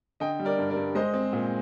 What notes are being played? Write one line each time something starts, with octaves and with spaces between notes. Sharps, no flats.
D3 D#5 G5
G3
A#4 D5
G2
A#4 D5
G2
G#3 C5 D#5
C4
A#2